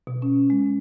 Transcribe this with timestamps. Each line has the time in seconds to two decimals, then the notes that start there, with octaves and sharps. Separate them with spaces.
0.07 B2
0.22 C#4
0.50 G#3